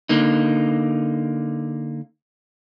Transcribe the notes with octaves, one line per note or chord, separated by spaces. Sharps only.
D3 A#3 D#4